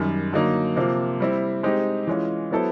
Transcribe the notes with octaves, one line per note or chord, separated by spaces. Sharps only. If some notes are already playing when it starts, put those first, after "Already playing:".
Already playing: F#2 D#3 G3
D3 F#3 A#3 D#4
C3 F3 A#3
G3 C4 E4
G#3 C4 D#4 G4
E3 G#3 C#4 F4
F#3 B3 E4 A4 C5